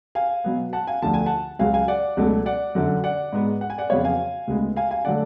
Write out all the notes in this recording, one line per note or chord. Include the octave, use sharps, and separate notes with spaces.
F5 G#5
B2 F#3 B3
F#5 A5
F5 G#5
D2 D3 F3 A3 A5
G#5
F#5 A5
C#2 C#3 F#3 F5 G#5
F5 G#5
D5 F#5
C#2 B2 F#3 A3
D5 F#5
F#2 D3 F#3
D5 F#5
G#2 G#3 B3
F#5
G#5
D5 F#5
F2 C#3 F#3 B3 C#5 F5
F5 G#5
D2 C#3 G#3 B3
F5 G#5
F5 G#5
D3 F#3 A3 D5 F#5